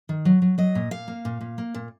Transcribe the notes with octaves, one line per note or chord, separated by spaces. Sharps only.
D#3
F#3
F#3
F#3 D#5
A#2
A#2 F5
A#3
A#2
A#2
A#3
A#2